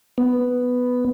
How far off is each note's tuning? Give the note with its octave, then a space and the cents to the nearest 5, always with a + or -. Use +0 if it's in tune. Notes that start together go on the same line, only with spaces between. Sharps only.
B3 +5